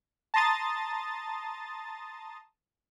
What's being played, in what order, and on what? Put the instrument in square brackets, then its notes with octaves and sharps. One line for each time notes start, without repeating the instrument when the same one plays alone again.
[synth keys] A5 A#5 C6 D#6 A6